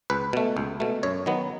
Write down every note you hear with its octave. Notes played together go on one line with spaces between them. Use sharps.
C#2 B4
B2 A3
C#2
B2 A3
F#2 C#5
D#3 F#3 B3